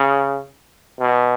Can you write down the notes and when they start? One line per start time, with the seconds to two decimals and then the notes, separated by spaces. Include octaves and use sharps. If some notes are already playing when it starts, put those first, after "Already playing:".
Already playing: C#3
1.00 B2